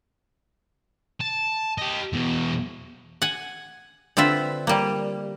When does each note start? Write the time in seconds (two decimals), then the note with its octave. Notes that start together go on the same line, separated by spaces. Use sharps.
1.21 A5
1.78 G4 D#5
2.13 E2 B2
3.22 F#5 G#5
4.17 D3 C4 F4 B4 E5
4.67 G3 A#3